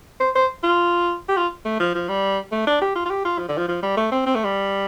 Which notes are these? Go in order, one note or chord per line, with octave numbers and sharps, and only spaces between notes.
C5
C5
F4
G4
F4
A3
F3
F3
G3
A3
D4
G4
F4
F4
G4
F4
F3
D3
F3
F3
G3
A3
C4
C4
A3
G3